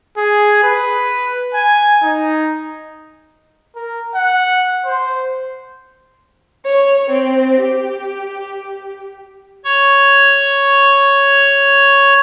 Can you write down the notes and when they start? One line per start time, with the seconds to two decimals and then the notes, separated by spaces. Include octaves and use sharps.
0.17 G#4
0.63 B4
1.54 G#5
2.03 D#4
3.76 A#4
4.15 F#5
4.86 C5
6.65 C#5
7.09 C4
7.61 G4
9.64 C#5 C#6